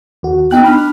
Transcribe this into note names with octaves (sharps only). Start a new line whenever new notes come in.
D#2 F#4
B3 D#4 G5 F#6
D4 B5 F6